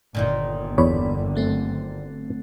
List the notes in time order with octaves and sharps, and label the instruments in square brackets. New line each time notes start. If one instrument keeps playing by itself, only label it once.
[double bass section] G1 D3 [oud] A#2 D#3 A#3
[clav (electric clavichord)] E2 C#5 [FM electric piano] D5 B5
[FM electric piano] F#3 A3 C4